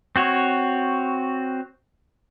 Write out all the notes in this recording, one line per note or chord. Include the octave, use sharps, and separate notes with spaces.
C4 F#4 C#5